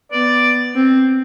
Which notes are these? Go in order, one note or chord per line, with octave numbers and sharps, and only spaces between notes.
B3 D5
C4